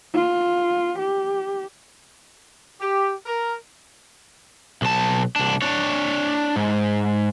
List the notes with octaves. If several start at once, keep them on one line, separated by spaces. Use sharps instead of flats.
F4
G4
G4
A#4
B1 A5
C2 D4
D4 C#5
G#2